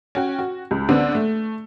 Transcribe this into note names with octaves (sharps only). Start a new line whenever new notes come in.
C#4 F#4 G5
F#4
C#2
D3 B3 C4 D4
A3